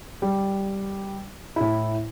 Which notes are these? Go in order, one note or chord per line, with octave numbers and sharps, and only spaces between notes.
G3
A2 E4